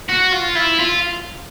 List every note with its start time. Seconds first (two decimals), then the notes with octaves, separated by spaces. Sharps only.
0.10 F#4
0.33 F4
0.56 E4
0.80 F4